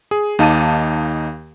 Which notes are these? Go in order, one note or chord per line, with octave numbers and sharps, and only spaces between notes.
G#4
D#2 D#4 F5 A5 D6 D#7